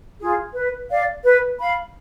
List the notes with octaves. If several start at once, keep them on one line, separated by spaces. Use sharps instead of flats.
F4 G#4
B4
D5 F5
B4
F5 B5